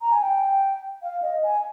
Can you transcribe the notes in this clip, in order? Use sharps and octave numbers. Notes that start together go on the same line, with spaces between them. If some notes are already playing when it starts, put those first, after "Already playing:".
A#5
G#5
G5
F5
D#5
G#5